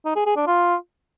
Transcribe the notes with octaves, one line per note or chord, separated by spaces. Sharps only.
D#4
G#4
G#4
D4
F4